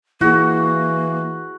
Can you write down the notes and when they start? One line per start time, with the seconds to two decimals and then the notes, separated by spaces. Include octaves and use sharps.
0.21 E3 A#3 E4 F#4 G#4